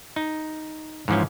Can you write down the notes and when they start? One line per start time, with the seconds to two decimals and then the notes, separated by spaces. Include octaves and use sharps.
0.16 D#4
1.08 G#2 E3 F3 C#4